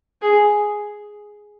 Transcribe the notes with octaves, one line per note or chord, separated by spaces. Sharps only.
G#4